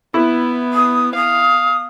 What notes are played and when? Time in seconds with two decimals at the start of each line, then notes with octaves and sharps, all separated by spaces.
0.14 B3 E4
0.72 D#6
1.14 F5 D#6